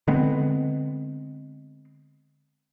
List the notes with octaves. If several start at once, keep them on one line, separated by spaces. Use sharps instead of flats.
D3 G#3 B3 C4